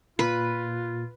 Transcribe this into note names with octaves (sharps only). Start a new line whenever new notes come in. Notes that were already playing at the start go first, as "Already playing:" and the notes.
A#2 F4 B4